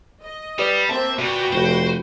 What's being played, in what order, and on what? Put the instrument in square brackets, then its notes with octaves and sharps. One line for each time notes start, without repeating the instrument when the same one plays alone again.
[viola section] D#5
[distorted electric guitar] G3 [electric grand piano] G4 B4 D5
[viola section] A#3 C4 [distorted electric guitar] E5 [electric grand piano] A5
[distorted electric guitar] A#2 [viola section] F#4 B4 G5
[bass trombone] F1 [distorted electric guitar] C5